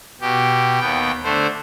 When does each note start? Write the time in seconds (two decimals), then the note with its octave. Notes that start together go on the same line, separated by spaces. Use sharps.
0.21 B2 G4
0.81 D#2 B3 G5
1.24 D3 A3 C5